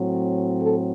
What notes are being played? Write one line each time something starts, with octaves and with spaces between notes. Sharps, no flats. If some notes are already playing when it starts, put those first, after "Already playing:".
Already playing: A2 F#3 C4
A4